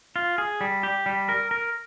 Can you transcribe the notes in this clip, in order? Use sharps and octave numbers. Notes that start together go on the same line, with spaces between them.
F4
G#4
G3
G4
G3
A#4
A#4